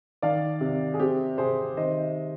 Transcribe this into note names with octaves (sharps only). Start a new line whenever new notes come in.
D#3 D5 F5
C3
G#4
C4 G4
C3 G#4 C5
D#3 C5 D#5